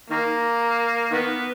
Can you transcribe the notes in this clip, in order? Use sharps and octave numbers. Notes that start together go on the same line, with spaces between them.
D#3 A#3
D#3 B3